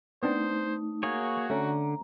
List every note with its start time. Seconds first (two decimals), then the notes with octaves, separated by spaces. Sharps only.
0.23 A3 B3 C4 D4 D#4 C5
1.03 A#3 F#4 G#4 C#5
1.50 D3 A3 C#4 A#5